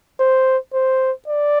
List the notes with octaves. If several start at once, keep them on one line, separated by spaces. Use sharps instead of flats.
C5
C5
D5